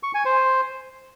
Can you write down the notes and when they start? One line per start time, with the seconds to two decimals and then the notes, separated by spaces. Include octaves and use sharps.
0.03 C#6
0.14 G#5
0.25 C5